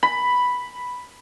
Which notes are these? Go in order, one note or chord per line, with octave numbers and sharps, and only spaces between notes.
B5